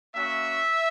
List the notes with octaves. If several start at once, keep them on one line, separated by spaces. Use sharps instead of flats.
A#3 C#4 F#4 E5